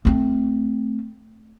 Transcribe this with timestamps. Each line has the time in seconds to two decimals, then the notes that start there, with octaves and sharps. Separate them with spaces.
0.05 A3 C4